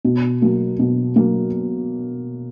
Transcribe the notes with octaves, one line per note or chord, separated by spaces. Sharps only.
B2
F#3 A#3
B2
F#3 A#3